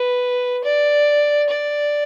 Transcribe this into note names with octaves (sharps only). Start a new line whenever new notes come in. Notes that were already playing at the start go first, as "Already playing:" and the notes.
Already playing: B4
D5
D5